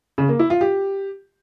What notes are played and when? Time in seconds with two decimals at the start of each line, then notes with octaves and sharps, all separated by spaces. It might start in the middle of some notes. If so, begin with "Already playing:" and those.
0.18 C#3
0.29 A#3
0.39 E4
0.50 F4
0.61 G4